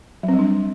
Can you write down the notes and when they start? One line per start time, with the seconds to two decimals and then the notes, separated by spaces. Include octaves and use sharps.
0.23 F#3
0.29 C4
0.34 G3
0.39 D4